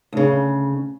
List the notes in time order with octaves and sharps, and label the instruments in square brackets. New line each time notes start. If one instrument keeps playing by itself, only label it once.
[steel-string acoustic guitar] D2 C#3